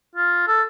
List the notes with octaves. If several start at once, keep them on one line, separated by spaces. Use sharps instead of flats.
F4
A4